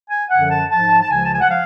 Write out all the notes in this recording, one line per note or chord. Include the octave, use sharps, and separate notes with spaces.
G#5
F#2 D3 F3 F#5
A5
G#2 F3 A5
A5
C#2 C#3 F3 G#5
A5
G#5
F#5
F3 F5